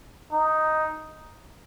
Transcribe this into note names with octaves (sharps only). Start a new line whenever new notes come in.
D#4